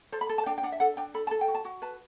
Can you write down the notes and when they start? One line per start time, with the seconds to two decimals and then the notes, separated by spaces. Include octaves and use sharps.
0.12 A4 C5
0.21 B5
0.29 A4
0.38 A5
0.46 D4 G5
0.58 G5
0.63 D4 F#5
0.72 E5
0.80 A4 F#5
0.97 D4 G5
1.14 A4 B5
1.27 A4 A5
1.41 G5
1.48 F#4
1.55 A5
1.65 F#4
1.82 B4 A5